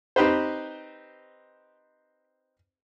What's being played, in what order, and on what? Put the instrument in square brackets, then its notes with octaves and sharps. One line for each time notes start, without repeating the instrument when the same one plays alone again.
[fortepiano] C4 D#4 G4 B4 C5